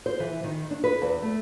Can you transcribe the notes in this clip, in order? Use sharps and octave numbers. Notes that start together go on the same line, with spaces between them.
C5
E3
D#3
D4
B4
E2
A3